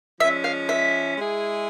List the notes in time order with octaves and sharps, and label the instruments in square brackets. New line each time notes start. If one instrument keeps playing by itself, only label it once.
[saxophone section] F3 G#3 C#4 [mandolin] E5
[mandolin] F5
E5
[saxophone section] G#3 E4 G#4